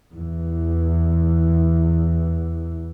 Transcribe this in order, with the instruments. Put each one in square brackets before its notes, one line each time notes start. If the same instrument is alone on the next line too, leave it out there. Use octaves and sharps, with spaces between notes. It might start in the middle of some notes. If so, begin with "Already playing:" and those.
[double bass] E2 E3